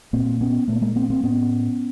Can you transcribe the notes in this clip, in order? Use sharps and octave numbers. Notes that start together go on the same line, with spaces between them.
A#2 A#3 C4
B3 C#4
A#2 A3 B3
G#3 A#3
A#3 C4
A#3 C4
A2 B3 C#4